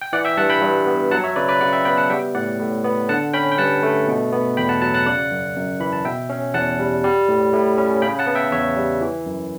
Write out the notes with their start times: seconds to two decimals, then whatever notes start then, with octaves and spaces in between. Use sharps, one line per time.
0.01 G5
0.13 E3 D5 F#5
0.25 E5 G5
0.37 G2 F#5 A5
0.50 G5 B5
0.62 G2
0.87 B3
1.11 F#3 F#5 A5
1.24 C#5 E5
1.36 C#3 B4 D5
1.48 B4 D5
1.61 C#3 D5 F#5
1.73 E5 G5
1.85 B3 G5 B5
1.97 F#5 A5
2.10 G3 E5 G5
2.35 A2 D5 F#5
2.60 A2
2.84 B3
3.09 D3 F#5 A5
3.34 C#4 G5 B5
3.52 G5
3.58 G2 F#5 A5
3.83 A3
4.08 B2
4.32 B3
4.57 E2 G5 B5
4.69 F#5 A5
4.82 F#3 F#5 A5
4.94 F#5 A5
5.06 C#3 D5 F#5
5.31 F#2
5.56 F#2
5.80 E3 B5
5.93 A5
6.05 B2 E5 G5
6.29 C#4
6.54 E2 F#5 A5
6.79 G3
7.04 G3
7.28 A2
7.53 A2
7.78 C#4
8.02 C#3 G5 B5
8.19 F#5 A5
8.27 B3
8.35 E5 G5
8.51 E2 C#5 E5
8.77 G3
9.01 E3
9.26 F#2